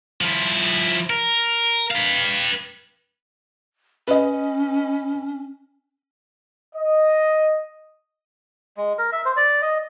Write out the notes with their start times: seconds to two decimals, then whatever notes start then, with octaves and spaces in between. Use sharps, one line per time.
0.21 F3 E4
1.10 A#4
1.91 B4 F5
4.08 C#4 B4 D#5
6.75 D#5
8.77 G#3
8.98 A#4
9.12 E5
9.25 C5
9.37 D5
9.62 D#5